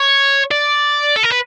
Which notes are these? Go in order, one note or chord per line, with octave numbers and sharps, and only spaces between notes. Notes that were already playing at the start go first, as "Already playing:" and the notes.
Already playing: C#5
D5
A4
A#4
B4